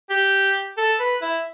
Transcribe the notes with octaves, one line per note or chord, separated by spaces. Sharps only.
G4
A4
B4
E4